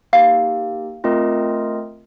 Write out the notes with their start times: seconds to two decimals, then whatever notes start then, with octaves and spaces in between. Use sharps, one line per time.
0.13 A#3 D#4 G4 F5
1.04 A3 C4 F4 A#4 D#5